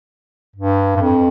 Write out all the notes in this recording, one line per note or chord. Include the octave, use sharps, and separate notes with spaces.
G2
G2
F2